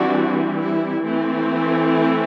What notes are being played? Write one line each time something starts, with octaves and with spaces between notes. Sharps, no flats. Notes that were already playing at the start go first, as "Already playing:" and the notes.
Already playing: E3 G3 C4 D4 F#4
E4
E3 A3 C4
E4